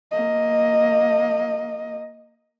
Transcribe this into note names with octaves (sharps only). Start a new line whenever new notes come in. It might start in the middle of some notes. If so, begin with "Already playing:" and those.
A#3 D#5